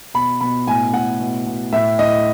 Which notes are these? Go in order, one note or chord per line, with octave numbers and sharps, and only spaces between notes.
B2 B5
B2 B5
A2 G#5
A2 F#5
B2
B2
A2 E5
A2 D#5